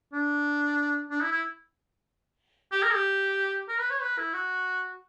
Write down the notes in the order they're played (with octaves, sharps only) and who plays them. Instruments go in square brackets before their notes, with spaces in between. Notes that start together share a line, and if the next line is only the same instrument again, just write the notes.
[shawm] D4
D4
E4
E4
G4
A#4
G4
A#4
B4
C#5
B4
E4
F#4